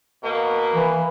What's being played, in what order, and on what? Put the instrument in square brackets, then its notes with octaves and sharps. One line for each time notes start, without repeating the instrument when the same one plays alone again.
[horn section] B2 A#3
[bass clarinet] E3